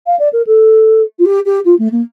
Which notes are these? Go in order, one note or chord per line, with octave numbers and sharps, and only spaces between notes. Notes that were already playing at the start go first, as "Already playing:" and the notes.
F5
D5
A#4
A4
F4
G4
G4
F4
A3
A#3